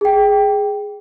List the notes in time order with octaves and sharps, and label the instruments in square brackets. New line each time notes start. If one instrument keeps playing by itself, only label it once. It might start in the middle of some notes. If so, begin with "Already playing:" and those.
[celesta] G#4 G5